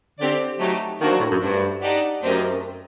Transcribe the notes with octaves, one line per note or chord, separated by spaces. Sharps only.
D3 C4 G4 D5
F#3 A3 D#4 G4
D#3 A#3 D4 F#4 C5
F#3
A2
F#2
G2 A3 D4 F#4 C5
D#4 G4 D5 F#5 A5
F#2 A3 C4 G4 A#4 D#5